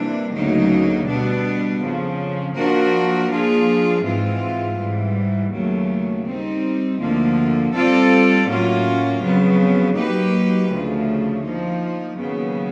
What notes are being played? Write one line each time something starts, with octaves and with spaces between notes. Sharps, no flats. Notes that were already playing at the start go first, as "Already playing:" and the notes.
Already playing: C3 E3 G3 A#3 D4
D2 C#3 F#3 A#3 D#4
B2 G3 B3 D4
F2 C#3 F3
F3 A#3 D4 F#4 A#4
F3 A#3 D4 F4 G#4
G#2 E3 G#3 C4 F4
G#2 E3 G3
D#2 C#3 F#3 A3
G3 C4 D#4
D2 D3 F3 A#3
G3 C4 F4 A4 D5
A2 F#3 A#3 C#4 F4
F2 C#3 F#3 B3
F#3 A#3 D#4 G4 B4
D2 C#3 F3 A3
F3 A#3 D#4
D#2 C#3 F#3 B3